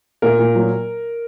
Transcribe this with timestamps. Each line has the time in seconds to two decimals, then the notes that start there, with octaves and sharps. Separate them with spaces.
0.22 A#2 A#4
0.39 A#2
0.56 F#3